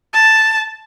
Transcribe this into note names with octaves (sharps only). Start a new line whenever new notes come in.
A5